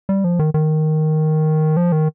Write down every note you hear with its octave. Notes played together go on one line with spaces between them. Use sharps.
G3
F3
D#3
D#3
F3
D#3